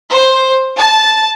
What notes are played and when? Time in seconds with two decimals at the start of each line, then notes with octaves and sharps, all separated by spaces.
0.12 C5
0.76 A5